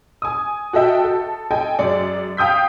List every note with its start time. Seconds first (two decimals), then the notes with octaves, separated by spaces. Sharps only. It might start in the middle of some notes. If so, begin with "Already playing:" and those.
0.22 G#5 D#6
0.73 F#4 A4 D#5 E5 G5
1.04 A4
1.51 A4 D#5 G5 G#5
1.79 F#2 G#3 D5 C#7
2.37 F5 G5 D#6 G6 B6